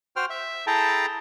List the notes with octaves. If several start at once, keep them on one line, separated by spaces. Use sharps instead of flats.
F#4 C5 G5 F6
E5
E4 G#4 A4 G5 A5 A#5